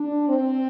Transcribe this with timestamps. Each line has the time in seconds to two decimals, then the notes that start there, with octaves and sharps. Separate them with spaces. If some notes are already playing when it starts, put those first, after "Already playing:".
Already playing: D4
0.28 C4